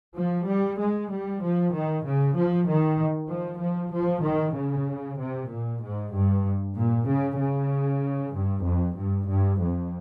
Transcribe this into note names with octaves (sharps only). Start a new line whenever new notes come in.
F3
G3
G#3
G3
F3
D#3
C#3
F3
D#3
F3
F3
F3
D#3
C#3
C3
A#2
G#2
G2
A#2
C#3
C#3
G2
F2
G2
G2
F2